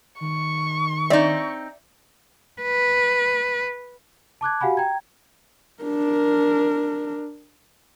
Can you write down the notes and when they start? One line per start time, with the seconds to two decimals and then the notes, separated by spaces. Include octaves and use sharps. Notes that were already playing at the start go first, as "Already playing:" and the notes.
0.21 D#3 C#6
1.10 C4 D#4 D5 E5
2.62 B4
4.41 A5 D6 F#6 G#6
4.61 F#4 G4 F5 F#5 G#5 B5
4.77 G5 A#5 G#6
5.83 D4 A#4